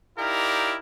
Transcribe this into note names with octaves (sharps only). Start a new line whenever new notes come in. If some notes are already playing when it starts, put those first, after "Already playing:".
D#4 E4 G4 A#4 D5 F5